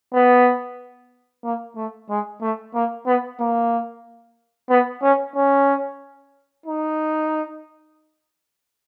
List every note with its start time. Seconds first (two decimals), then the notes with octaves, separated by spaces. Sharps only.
0.14 B3
1.44 A#3
1.76 A3
2.09 G#3
2.41 A3
2.75 A#3
3.07 B3
3.40 A#3
4.70 B3
5.02 C#4
5.35 C#4
6.66 D#4